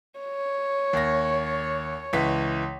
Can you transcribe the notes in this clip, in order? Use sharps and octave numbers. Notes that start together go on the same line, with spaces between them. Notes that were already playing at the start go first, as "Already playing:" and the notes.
C#5
D#2 A#6
C#2 E3 B6